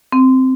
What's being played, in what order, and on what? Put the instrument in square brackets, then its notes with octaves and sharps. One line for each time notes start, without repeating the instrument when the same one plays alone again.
[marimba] C4